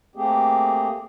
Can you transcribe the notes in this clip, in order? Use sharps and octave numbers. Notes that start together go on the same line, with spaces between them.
A3 A#3 C4 G4 G#4